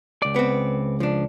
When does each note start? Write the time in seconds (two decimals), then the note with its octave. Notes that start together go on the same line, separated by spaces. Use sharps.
0.22 C#2 D5
0.36 B3 C4
1.00 F3 D4